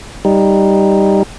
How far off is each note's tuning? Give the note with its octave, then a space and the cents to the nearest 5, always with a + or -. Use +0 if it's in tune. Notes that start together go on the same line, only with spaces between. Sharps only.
G3 +0 D#4 +0